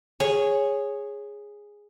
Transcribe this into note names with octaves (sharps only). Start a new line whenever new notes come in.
G#4 C#5